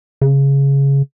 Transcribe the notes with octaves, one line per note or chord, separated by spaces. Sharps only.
C#3